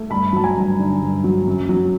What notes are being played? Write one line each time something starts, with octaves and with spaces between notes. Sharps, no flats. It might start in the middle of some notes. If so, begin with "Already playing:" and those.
Already playing: A3
G2 A5 B5
F#3 A5
G#5 A#5
G2
D3
G2
F#3
F#2
F#3